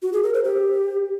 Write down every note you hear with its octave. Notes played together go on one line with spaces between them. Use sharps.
F#4
G#4
A#4
C5
G4